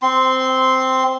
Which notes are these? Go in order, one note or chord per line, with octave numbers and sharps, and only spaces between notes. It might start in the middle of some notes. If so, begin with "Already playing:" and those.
C4 C6